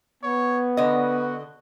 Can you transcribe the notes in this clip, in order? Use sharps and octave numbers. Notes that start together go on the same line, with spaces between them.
B3 C#5
D3 F#4 D#5